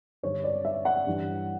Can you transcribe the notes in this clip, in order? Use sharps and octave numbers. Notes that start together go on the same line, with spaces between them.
G2 D3 C#5
D5
E5
F#5
G2 E3